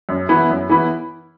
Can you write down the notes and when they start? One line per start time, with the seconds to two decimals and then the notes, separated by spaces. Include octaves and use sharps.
0.09 F#2
0.29 E3 B3 E4
0.50 F#2
0.69 E3 B3 E4